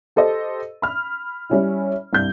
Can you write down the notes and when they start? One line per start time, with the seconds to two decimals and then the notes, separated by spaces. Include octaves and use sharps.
0.16 G4 A4 C5 D#5
0.82 B5 F6
1.50 G3 C#4 E4
2.13 C2 G2 G6